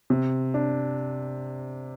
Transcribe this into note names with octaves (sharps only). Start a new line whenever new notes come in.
C3
D4